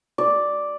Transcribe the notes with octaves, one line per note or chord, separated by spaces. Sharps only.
D5